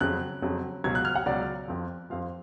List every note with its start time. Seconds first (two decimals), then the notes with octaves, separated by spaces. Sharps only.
0.01 F2 C#3 F#3 F#6
0.42 F2 C#3 F#3
0.84 C#2 B2 F#3 G#6
0.95 F#6
1.05 F6
1.15 F#5
1.26 C#2 B2 F#3 D5
1.68 F2 F3
2.10 F2 F3 F5